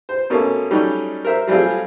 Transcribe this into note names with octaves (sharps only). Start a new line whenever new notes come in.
C5
B2 A3 A#3 C#4
F#3 G3 A3 C#4 D#4
A#4 C5 E5
F#3 G3 A3 C4 F4 G#4